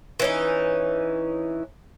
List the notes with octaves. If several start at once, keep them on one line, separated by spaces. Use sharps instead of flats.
E3 C#4 D#4